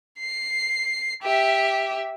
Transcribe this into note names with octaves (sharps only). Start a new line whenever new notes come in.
C7
G4 E5